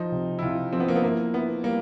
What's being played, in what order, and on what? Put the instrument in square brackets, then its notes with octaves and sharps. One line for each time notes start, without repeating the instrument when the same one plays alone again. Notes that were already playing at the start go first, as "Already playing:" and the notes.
Already playing: [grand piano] F3 [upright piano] D#4
[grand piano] C3
[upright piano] E4
[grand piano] C3 [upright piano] F4
[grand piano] F3 [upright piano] C4
[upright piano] B3
A#3
B3
[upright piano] A#3 [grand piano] E4
[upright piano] B3 [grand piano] E4
[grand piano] G3 [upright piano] A#3